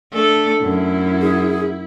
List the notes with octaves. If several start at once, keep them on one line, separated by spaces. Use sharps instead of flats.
A3 D4 A4
F#2 E4
G#4